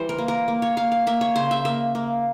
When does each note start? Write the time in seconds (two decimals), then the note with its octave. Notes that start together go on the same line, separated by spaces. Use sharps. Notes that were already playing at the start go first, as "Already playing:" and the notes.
Already playing: E3 G3 C5
0.09 A#4
0.18 A#3
0.28 A#4
0.48 A#3
0.62 C#5
0.77 A#3 F5
0.92 F5
1.07 A#3 E5
1.21 C#5
1.36 C#3 C5
1.51 E5
1.65 A#3 E5
1.95 A#3